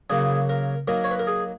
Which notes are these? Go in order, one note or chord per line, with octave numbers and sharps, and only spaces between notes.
C#3 F#3 A#3 G#4
A#4
F#3 A#3 D#4 A#4
C#5
B4
A#4
G#4